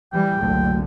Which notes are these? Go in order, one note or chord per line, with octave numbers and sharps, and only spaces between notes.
E3 G3 G5
F#1 C2 D3 F#3 A3